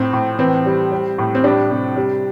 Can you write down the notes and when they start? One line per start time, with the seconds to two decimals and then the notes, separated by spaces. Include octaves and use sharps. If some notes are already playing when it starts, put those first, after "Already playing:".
Already playing: A2 C4
0.13 A2
0.39 E3 C4
0.66 G3
0.92 G3
1.18 A2
1.35 C4
1.44 G3 D4
1.70 C3
1.96 G3